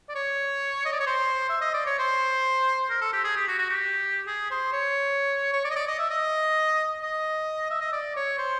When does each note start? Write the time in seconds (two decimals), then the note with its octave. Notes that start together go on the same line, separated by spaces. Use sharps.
0.09 D5
0.15 C#5
0.85 D#5
0.92 D5
1.00 C#5
1.06 C5
1.49 E5
1.61 D#5
1.74 D5
1.86 C#5
1.99 C5
2.90 A#4
3.01 A4
3.13 G4
3.24 G#4
3.36 G4
3.48 F#4
3.58 F#4
3.69 G4
4.27 G#4
4.51 C5
4.73 C#5
5.53 C#5
5.64 D5
5.70 D#5
5.76 D5
5.87 D#5
5.99 E5
6.10 D#5
7.02 D#5
7.70 E5
7.81 D#5
7.92 D5
8.16 C#5
8.38 C5